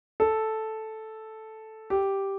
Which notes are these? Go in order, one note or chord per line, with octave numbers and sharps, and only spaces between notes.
A4
G4